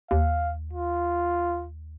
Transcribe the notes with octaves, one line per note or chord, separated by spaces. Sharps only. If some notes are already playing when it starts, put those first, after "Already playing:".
D#2 F5
F4